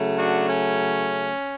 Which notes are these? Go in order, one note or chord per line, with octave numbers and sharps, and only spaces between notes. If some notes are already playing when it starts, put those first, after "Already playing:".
Already playing: C#3 F#3 A3
D4 F#4
C#4